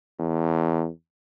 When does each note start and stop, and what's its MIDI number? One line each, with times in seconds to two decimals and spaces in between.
0.20 0.89 40